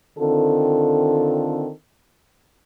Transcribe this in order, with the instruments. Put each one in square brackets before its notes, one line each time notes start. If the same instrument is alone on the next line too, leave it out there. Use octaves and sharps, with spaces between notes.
[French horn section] D3 D#3 C4 F4 A4